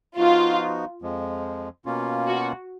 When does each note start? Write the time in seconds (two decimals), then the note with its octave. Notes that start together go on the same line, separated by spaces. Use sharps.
0.17 F3 B3 D#4 F4 F#4
1.02 F2 F3 G#3
1.85 B2 A#3 C#4 F4
2.28 F#4